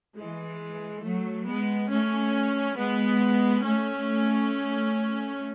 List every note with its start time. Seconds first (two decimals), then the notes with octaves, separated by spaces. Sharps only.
0.18 E3 G#3
1.04 F#3 A3
1.47 G#3 B3
1.91 A3 C#4
2.77 G#3 B3
3.63 A3 C#4